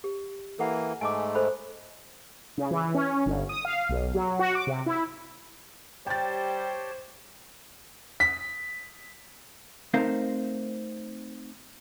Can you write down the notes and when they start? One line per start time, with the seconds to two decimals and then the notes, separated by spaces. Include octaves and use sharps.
0.04 G4
0.59 E3 A#3 A4 F#5
1.01 G#2 A3 G#5 A5 D6
1.35 A4 C5 B5
2.58 C#3
2.71 E3
2.94 C#4
3.26 G1
3.49 D#6
3.65 F5
3.89 B1
4.14 F#3
4.39 F#4
4.55 D6
4.67 C3
4.86 E4
6.07 G3 G4 C5 C#5 G5 A5 A6
8.20 B6
9.94 A3 C4 D#4 A#4 C5 F5